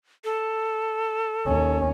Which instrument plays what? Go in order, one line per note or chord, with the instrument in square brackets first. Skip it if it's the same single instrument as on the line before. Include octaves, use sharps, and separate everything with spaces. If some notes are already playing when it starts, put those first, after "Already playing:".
[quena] A4
[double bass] D#2 C#4